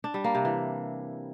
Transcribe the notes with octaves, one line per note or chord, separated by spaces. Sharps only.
D4
G3
A#3
C3
E3